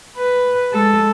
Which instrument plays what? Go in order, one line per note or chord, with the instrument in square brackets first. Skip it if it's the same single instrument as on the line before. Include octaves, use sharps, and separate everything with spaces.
[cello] B4
G#3 A4